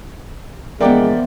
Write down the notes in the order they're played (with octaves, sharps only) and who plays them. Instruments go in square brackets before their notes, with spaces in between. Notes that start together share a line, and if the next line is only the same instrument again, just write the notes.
[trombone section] A#1 G#3 [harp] E3 F3 B3 [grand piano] A#4 D5 G5